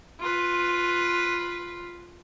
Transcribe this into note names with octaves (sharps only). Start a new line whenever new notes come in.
F4 B4